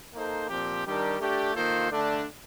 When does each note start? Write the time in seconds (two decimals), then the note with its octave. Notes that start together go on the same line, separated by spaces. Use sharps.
0.15 A#3 D#4 A4 C5
0.49 A#2 F3 C4 G4
0.85 D#3 G3 D4 G4 A#4
1.19 A3 D4 G4
1.54 D#3 A#3 F4 A4 C5
1.90 D3 A3 D4